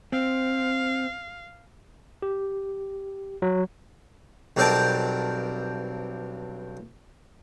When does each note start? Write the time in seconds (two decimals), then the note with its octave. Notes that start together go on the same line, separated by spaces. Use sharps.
0.12 C4 F5
2.22 G4
3.42 F#3
4.57 B1 G2 C4 A#4 G5 A5